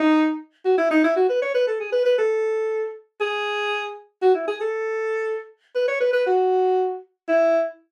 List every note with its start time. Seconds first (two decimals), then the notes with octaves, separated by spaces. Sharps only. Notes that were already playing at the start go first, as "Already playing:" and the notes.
Already playing: D#4
0.65 F#4
0.78 E4
0.91 D#4
1.04 E4
1.16 F#4
1.29 B4
1.42 C#5
1.55 B4
1.67 A4
1.80 G#4
1.92 B4
2.05 B4
2.18 A4
3.21 G#4
4.22 F#4
4.35 E4
4.47 G#4
4.61 A4
5.75 B4
5.88 C#5
6.00 B4
6.13 B4
6.27 F#4
7.28 E4